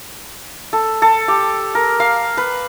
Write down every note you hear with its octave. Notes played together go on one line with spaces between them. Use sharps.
A4
A4
G4
A#4
F5
B4